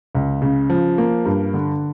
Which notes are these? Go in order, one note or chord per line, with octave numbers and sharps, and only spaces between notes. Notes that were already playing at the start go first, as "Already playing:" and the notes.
C#2
C#3
F3
A#3
G2
D3